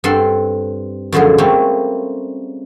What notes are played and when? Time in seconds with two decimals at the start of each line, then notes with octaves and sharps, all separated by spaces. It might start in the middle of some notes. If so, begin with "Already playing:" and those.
0.04 G2 C4 A4 B5 C6
1.12 F#2 D3 F3 G#3 G#4
1.38 G3 A3 A#3 C4 C#4